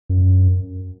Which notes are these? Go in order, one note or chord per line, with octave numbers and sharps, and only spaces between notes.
F#2